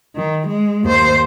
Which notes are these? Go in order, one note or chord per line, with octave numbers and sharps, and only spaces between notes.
D#3
G#3
D#2 C5